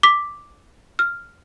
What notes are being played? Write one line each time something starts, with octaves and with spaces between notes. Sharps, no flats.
D6 B6
F6